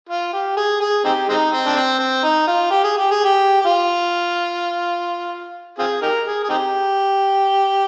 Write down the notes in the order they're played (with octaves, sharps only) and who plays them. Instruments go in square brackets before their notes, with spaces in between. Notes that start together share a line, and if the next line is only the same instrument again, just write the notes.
[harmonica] F4
G4
G#4
G#4
C4 D#4 G4
G#3 C4 D#4
C4
D4
C4
C4
D#4
F4
G4
G#4
G4
G#4
G4
G4
F4
C4 F4 G#4
D#4 G4 A#4
G#4
G#4
C4 D#4 G4